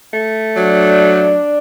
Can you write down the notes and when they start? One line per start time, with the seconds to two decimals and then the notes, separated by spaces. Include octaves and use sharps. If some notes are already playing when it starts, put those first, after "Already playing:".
0.13 A3
0.56 F#3 D4